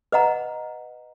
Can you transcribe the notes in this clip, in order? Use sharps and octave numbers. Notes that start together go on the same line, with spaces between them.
B4 D#5 F#5 A#5